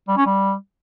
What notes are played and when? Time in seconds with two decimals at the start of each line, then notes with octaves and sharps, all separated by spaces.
0.08 G3
0.17 C#4
0.26 G3